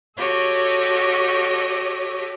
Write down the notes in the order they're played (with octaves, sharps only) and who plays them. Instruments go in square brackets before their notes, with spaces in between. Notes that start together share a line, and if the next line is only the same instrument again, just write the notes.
[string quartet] F#4 G4 A4 C#5 D#5